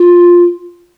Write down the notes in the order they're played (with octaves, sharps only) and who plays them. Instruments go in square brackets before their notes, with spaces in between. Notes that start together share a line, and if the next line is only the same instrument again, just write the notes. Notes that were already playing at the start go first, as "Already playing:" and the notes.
Already playing: [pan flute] F4